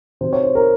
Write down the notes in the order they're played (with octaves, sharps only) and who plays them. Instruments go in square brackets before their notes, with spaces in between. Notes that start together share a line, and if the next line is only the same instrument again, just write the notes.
[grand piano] C3 F#3 C5
C#5
C5
A#4